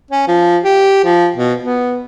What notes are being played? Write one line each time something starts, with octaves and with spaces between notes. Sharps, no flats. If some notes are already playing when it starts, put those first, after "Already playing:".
C#4
F3
G4
F3
B2
B3